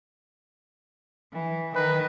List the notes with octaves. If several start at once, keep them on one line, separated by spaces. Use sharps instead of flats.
E3
D#3 B4